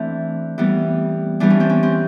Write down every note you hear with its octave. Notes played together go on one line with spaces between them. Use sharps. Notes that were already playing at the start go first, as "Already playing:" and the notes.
Already playing: E3 A3 C4 D4
E3 G3 B3
E3 G3 B3 D4
C#4
C4
C#4
C4